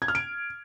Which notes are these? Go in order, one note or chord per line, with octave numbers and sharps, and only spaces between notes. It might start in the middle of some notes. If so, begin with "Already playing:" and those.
G#6
F6
D7